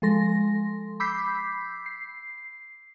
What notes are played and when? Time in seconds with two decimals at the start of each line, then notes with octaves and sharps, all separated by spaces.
0.02 F3 G#3 A4 C6 A#6
1.00 B5 D6 E6 G6 B6 C7
1.86 C7